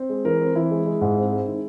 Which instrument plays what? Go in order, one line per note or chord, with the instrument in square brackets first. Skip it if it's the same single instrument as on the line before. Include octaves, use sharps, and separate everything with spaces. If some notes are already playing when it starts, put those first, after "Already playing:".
Already playing: [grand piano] C4
G#3
E3 A#4
C4
E3 E4
G#3
G#3
G#2
C4
G#3
D#3